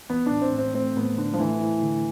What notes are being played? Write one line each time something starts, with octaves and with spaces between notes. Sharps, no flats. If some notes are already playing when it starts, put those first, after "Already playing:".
E3 B3
A2 D4
C4
A2
C4
A3 C4
A2 B3
A2 D3
F3
E3 A3
E4
D3